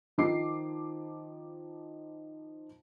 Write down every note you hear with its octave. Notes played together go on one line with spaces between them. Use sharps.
D#3 F3 D#4 D6 C7